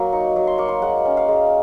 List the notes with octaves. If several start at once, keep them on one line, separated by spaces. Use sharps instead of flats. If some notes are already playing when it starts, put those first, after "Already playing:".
Already playing: F#3 A#3
D#4 C#6
F#3
C6
A#3 C#6
C6
G#3 F#5
C#4
F5
G#3